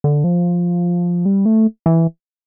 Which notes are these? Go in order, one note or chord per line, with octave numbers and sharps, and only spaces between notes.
D3
F3
G3
A3
E3